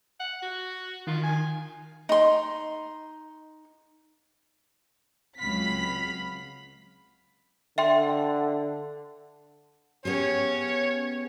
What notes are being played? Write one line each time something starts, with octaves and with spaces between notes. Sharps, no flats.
F#5
F#4
D#3 F4
G#5
D#4 C6
C#2 F#3 C4 F5 B5 B6
D3 E5 G5 C6
B3 C#4 G4 G#4 C#5